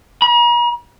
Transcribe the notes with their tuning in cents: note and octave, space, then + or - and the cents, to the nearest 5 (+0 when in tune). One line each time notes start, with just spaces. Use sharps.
A#5 +45